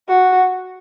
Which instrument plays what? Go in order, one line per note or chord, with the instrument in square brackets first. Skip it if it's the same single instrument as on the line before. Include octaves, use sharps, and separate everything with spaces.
[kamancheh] F#4